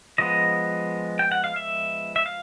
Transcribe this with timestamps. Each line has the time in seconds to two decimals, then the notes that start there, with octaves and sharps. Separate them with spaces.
0.18 F3 G#3 B3 D#5
1.19 G5
1.32 F#5
1.44 F5
1.56 E5
2.16 E5
2.26 F5